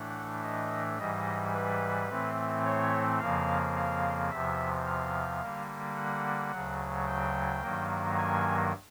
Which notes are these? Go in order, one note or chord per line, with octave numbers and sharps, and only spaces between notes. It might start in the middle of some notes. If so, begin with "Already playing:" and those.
Already playing: A2 E3 A3 D4 F#5
D#5
G#2 E3 G3 D#5
B4
A2 E3 A3 C4
C#5
F2 C#3 F3 A#3 F5
F5
E2 C3 F3 E5
F5
D3 G3 A#3
F#5
D2 C#3 F#3
G5
G2 D#3 F#3 A#3
G#5